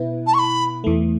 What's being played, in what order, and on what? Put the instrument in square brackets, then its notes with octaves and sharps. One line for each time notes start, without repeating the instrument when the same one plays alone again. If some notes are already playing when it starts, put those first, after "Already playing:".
Already playing: [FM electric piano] B2 B3 E4 B4
[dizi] A5
C#6
B5
[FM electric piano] E2 E3 A3